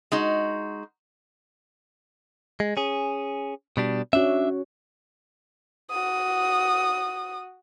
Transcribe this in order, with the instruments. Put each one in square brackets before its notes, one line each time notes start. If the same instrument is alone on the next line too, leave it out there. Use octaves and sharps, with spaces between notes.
[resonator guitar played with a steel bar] G#3 D#4 F#4
[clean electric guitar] G#3
C#4 G#4
B2 G3 D4
[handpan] C#4 F#4 [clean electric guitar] D4 E5
[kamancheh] F#4 D#6